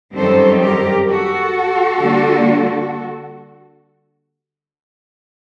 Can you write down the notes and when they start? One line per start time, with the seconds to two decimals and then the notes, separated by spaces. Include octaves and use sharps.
0.16 F#2 D#3 G3 C4 D#4 A4 C5
0.62 G4 A#4
1.08 F#4 A4
2.01 D3 G3 A#3 D4